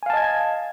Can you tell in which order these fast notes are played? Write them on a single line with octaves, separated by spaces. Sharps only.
G#5 F5 A5 D#5 G#6